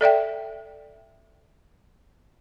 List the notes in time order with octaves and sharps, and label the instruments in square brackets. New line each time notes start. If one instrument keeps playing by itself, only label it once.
[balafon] A4 D5 E5 G5